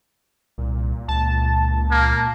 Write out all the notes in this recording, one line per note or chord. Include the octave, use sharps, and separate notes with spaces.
C2 A#2
C#2 A5
A#3